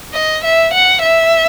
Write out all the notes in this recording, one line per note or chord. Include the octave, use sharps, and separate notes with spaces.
D#5
E5
F#5
E5